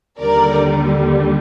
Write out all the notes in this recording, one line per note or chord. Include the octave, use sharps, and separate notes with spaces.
D#2 D3 G3 A#4 D5